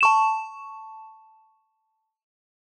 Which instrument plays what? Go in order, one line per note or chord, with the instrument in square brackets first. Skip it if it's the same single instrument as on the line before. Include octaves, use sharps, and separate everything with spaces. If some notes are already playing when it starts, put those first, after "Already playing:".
[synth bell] A5 C#6 E7